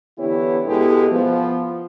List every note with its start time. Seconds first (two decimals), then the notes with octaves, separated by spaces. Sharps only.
0.18 D3 E3 B3 E4 G4 C#5
0.66 B2 G#3 B3 E4 G4 A4
1.11 F3 B3